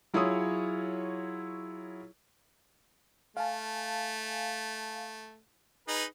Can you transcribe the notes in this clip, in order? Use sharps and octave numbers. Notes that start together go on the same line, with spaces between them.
F#3 E4 F4 G#4 C#5 D#6
A3 F5 G#5 A5
D#4 G#4 B4